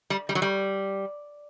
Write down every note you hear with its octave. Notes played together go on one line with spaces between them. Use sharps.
G3
G3
F#3
G3